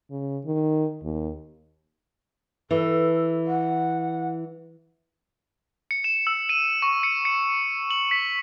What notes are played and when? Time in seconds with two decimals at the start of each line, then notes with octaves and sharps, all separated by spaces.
0.10 C#3
0.45 D#3
1.03 D#2
2.71 E3 A4
3.47 F#5
5.91 C#7
6.04 E7
6.27 E6
6.49 D#7
6.82 C#6
7.03 C#7
7.25 C#7
7.91 F#7
8.11 B6